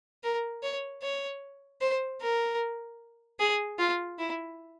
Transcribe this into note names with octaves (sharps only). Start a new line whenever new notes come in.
A#4
C#5
C#5
C5
A#4
G#4
F4
E4